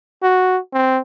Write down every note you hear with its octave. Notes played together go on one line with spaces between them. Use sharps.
F#4
C4